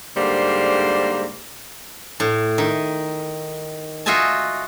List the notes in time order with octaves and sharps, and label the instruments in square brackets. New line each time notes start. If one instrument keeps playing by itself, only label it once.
[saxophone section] G#2 D3 G3 A#3 C5
[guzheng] A2
D#3
F4 F#4 D#5 E5 G#5 A5